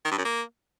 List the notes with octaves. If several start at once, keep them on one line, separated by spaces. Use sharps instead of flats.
D#3
G2
F#2
A#3